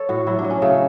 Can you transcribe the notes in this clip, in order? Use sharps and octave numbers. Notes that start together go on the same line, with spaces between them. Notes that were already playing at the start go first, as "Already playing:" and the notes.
Already playing: A4 C#5
A2 F#4
F#3 E4
D4
F#3
C#4
C#3 A3